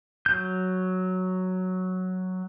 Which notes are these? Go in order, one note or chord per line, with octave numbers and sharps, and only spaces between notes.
F#3 G6